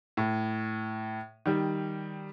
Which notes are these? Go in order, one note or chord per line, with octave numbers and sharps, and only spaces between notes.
A2
D#3 G3